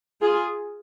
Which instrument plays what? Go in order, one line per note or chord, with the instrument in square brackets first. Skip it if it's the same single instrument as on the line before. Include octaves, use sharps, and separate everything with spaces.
[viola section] F4 G#4